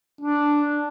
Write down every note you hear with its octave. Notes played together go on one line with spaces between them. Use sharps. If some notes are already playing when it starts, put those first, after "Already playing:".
D4